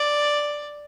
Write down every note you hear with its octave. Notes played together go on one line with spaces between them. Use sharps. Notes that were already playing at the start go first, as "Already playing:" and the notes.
Already playing: D5